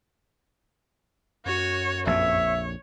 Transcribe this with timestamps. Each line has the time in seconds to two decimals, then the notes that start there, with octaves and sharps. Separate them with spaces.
1.46 F#2 F#4 C#5
2.07 A#1 F2 C#5 E5